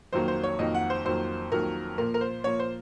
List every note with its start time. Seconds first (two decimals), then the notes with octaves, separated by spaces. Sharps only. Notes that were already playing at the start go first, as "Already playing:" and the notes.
0.13 F2 D#3 F#3 A#3 C5
0.28 C5
0.43 C#5
0.59 F2 D#3 F#3 A#3 D#5
0.75 F#5
0.90 C5
1.05 F2 D#3 F#3 A#3 C5
1.52 F2 D#3 F#3 A#3 A#4
1.98 A#2 F3 A#3 A#4
2.14 A#4
2.21 C5
2.44 A#2 F3 A#3 C#5
2.59 C5